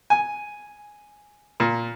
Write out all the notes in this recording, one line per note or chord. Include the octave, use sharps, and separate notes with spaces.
G#5
A#2